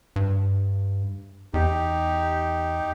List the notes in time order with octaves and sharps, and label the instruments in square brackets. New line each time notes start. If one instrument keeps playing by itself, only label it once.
[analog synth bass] G2
[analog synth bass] E2 [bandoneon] D#4 G4